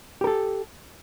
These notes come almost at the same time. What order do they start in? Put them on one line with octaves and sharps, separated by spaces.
G4 A#4 A4